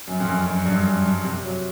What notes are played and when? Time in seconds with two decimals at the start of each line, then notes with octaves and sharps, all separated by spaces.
0.08 F#2
0.20 F2
0.28 F#2
0.47 F#2
0.66 G2
0.86 F#2
1.05 G2
1.25 C3
1.44 F#3